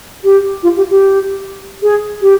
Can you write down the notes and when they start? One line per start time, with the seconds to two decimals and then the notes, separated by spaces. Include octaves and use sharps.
0.24 G4
0.63 F4
0.76 G4
0.90 G4
1.82 G#4
2.21 G4